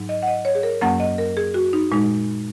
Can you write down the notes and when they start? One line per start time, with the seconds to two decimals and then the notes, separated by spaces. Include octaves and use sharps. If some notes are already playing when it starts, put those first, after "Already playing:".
Already playing: G#2 F#3 D#4
0.09 D#5
0.22 F#5
0.28 D#5
0.45 C#5
0.55 G#4
0.63 A#4
0.81 F#2 F#3 A#3 C#4 F#5
1.00 D#5
1.18 A#4
1.37 G#4
1.54 F#4
1.73 D#4
1.92 A#2 G#3 D#4